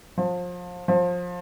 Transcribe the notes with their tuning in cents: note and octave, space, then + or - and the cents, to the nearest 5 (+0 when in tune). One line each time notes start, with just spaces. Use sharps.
F3 +30
F3 +25